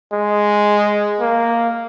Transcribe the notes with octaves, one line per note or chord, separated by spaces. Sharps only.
G#3
A#3